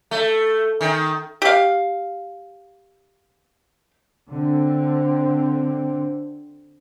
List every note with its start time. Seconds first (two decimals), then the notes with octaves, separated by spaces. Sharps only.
0.11 A3
0.81 D#3
1.42 G4 F5
4.32 D3 C4